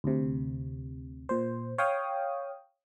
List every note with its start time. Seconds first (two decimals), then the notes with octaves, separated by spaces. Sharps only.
0.04 D2 C3
1.29 A#2 C5
1.78 C#5 F5 G5 D#6